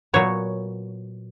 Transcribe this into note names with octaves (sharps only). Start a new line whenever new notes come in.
A#2 F#3 B3 C#5